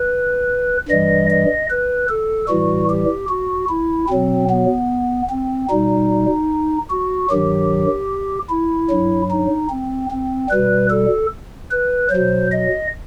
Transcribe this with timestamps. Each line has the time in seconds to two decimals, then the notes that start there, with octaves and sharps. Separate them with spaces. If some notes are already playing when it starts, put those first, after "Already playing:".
Already playing: B4
0.88 G2 E3 G3 D#5
1.30 D#5
1.70 B4
2.09 A4
2.49 A2 E3 G3 F#4
2.90 G4
3.29 F#4
3.69 E4
4.09 B2 F#3 C4
4.50 B3
5.30 C4
5.69 B2 G3 D#4
6.91 F#4
7.31 G2 D#3 F#3 G4
8.50 E4
8.91 G2 F#3
9.30 D#4
9.70 C4
10.11 C4
10.50 B2 G3 B4
10.90 A4
11.71 B4
12.10 F#3 C5
12.16 B2
12.51 D#5